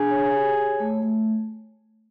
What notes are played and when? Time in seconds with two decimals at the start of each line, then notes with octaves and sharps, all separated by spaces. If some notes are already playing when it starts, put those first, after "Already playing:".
Already playing: D4 G#4
0.10 C#5
0.34 G4
0.57 C#5
0.80 A3
1.02 A3